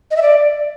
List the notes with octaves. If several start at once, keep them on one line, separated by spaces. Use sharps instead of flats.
D#5
E5
D5